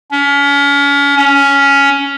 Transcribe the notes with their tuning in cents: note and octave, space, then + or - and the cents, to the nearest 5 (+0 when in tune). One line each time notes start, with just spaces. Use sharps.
C#4 +35
C#4 +10